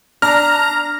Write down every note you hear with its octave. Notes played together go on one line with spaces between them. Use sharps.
D4 A#5 F6